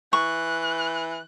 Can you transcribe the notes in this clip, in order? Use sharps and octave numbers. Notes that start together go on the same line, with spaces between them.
E3 C#6 F#6